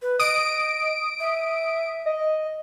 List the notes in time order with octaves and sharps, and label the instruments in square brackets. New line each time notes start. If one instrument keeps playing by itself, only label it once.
[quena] B4
[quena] D#5 [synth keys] D#6 D7
[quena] E5
[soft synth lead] D#5